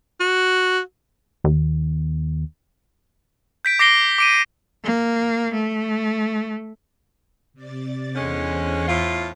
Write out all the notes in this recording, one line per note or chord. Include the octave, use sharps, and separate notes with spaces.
F#4
D#2
G6 B6 D7
D6 A#6 C7 D7 G7
D6 D7 D#7
A#3
A3
C3 D5 A6
E2 D3 G#3 C#4 C5 A#6
A2 F4